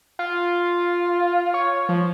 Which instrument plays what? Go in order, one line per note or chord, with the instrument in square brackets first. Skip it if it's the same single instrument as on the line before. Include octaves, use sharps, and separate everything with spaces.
[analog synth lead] F4
C#5
F3